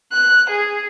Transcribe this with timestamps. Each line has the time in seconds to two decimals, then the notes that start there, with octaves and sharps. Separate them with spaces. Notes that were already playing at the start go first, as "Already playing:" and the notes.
0.12 F#6
0.50 G#4